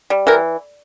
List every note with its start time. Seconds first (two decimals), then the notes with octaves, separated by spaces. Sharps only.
0.10 G3
0.27 E3 A#4